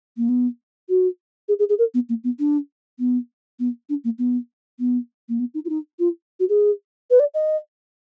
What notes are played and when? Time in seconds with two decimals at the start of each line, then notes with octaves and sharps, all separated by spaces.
0.17 A#3
0.29 B3
0.89 F#4
1.49 G#4
1.59 G#4
1.69 G#4
1.79 A#4
1.94 B3
2.09 A#3
2.24 B3
2.39 D4
2.99 B3
3.60 B3
3.89 D4
4.04 A#3
4.19 B3
4.79 B3
5.29 A#3
5.40 B3
5.54 D#4
5.65 F4
5.69 D#4
5.99 F4
6.40 F#4
6.49 G#4
7.11 B4
7.20 D5
7.34 D#5